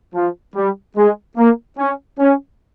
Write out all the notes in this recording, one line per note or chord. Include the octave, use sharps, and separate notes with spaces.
F3
G3
G#3
A#3
C#4
C#4